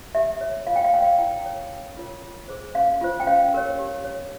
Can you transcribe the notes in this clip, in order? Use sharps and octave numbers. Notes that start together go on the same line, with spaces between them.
G4 E5
C#5
F4 F5
G5
F5
A#4 C#5 G5
F5
E4 G5
A#4 C#5
C#4
F4 A#4 C#5
F4
G#4 C5
C#4 F5
F4 C5
G5
C#4 F5
G4 A#4 C#5
G4
C#5